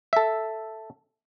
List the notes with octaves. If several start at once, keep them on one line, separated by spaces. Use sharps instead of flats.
A4 E5